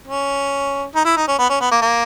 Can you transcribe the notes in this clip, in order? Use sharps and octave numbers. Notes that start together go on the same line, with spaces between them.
C#4
D#4
E4
D#4
C#4
B3
C#4
B3
A#3
A#3